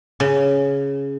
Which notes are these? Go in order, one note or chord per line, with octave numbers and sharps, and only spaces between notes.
C#3